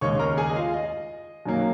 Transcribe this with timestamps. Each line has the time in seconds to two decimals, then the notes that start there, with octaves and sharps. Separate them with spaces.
0.01 D#2 C#3 G#3 D#4 C#5 C#6
0.19 A#4 A#5
0.37 G#4 G#5
0.49 D#5
0.56 F4 F5
0.74 D#5
1.46 F#2 D#3 F#3 A#3 D#4